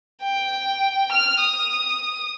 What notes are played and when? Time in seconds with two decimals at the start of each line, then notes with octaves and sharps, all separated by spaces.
0.22 G5
1.12 F6
1.41 D#6